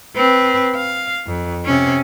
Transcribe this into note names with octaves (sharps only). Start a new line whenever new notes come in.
C4 B4
F5
F2
C3 C#4